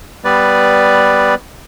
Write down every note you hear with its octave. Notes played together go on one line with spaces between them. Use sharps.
G3 B3 B4 D5